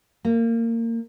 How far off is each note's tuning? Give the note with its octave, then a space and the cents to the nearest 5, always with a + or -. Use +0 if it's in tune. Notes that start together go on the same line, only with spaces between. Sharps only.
A#3 -25